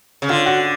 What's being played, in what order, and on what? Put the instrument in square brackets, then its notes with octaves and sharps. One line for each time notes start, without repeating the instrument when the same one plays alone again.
[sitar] C#3
[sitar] D3 [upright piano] F4
[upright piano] F#4